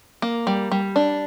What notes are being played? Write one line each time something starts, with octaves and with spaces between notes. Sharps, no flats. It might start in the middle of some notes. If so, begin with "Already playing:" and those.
A#3
G3
G3
D4